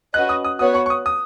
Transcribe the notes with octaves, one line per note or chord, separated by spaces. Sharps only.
C#4 F#4 B4 D#5 F#6
D#6
D#6
B3 F#4 C#5 F#5 D#6
C#6
C#6
D#6
D#6